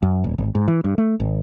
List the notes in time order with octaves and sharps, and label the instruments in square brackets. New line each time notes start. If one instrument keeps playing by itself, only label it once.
[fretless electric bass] F#2
D#1
G#1
G#2
E3
G2
A3
G#1